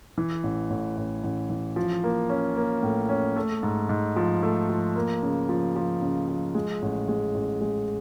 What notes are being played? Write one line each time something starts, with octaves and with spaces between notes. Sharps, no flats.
E3
A1
A1
A1
A1
E3
F3
A#3
C#4
A#3
A2
C#4
A3
G#2
G#2
F3
A3
F3
A#3
C#3
F3
F3
C#3
F3
G#3
A1
G#3
A1
G#3